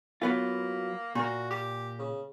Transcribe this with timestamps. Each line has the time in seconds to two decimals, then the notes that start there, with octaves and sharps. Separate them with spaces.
0.22 F#3 A#3 B3 F4
1.15 A#2 A#3 F#4
1.50 G4
1.99 C#3